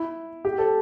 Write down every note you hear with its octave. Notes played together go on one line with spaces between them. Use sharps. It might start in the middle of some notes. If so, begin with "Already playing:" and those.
Already playing: E4
G4
A4